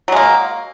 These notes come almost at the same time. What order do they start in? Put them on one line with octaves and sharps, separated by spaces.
F#3 G#3 A#3